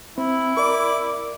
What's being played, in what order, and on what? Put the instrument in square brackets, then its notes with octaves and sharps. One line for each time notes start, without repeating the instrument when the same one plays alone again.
[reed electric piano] C4 [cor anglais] E4
[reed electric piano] A#4 D5 [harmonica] D6